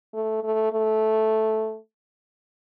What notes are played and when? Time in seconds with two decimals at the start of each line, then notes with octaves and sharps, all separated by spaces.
0.14 A3
0.43 A3
0.72 A3